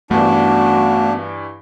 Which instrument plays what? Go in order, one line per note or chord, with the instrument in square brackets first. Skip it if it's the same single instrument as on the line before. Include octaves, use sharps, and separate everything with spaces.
[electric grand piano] G2 E3 [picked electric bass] A3 B3 [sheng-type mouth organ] D4 [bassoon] F#4